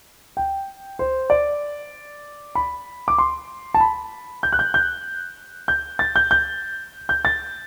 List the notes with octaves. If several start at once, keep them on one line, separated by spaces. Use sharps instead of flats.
G5
C5
D5
B5
D6
C6
A5
B5
G6
F#6
G6
G6
G6
A6
G6
G6
G6
A6